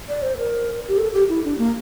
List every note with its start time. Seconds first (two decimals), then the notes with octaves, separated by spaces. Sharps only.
0.09 D5
0.22 C5
0.38 A#4
0.88 G4
0.98 A4
1.13 G4
1.29 E4
1.44 D4
1.58 A#3